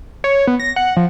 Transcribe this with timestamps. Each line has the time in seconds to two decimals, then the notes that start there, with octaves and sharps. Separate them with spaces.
0.24 C#5
0.47 B3
0.60 A#6
0.76 F#5
0.97 F3